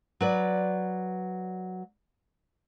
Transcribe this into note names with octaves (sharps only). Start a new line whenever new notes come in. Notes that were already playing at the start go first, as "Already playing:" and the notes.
F#3 B4 D5